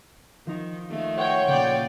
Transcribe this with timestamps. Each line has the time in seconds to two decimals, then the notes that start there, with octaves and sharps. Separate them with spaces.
0.47 D#3 F3 D#4
0.88 D#3 A3 F4
1.17 C5 C#5 F#5 G5 C#6
1.47 A#2 C#3 F4 D5